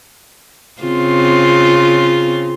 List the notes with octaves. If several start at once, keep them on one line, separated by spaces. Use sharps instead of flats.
C#3 C4 F4